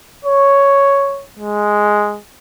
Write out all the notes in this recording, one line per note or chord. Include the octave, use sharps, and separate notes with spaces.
C#5
G#3